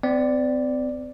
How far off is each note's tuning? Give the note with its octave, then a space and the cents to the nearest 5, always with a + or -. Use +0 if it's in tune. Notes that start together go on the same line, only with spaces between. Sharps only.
C4 -35 D5 +0